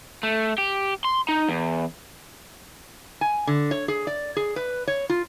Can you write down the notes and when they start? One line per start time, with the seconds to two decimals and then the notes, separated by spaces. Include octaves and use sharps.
0.23 A3
0.58 G4
1.04 C6
1.29 D#4
1.49 E2
3.21 G#5
3.47 D3
3.71 C#5
3.88 G#4
4.07 D5
4.36 G#4
4.56 B4
4.87 C#5
5.09 F4